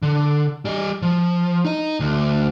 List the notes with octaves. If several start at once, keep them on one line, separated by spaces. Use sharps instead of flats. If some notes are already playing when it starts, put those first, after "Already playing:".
D3
G3 D#5
F3
D#4 D#5
D2